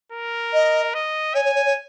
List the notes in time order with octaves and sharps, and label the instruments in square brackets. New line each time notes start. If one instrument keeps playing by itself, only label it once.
[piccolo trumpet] A#4
[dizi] D#5
[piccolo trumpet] D#5
[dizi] C#5 [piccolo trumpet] G#5
[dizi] C#5
C#5
C#5